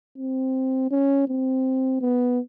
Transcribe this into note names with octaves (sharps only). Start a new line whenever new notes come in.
C4
C#4
C4
B3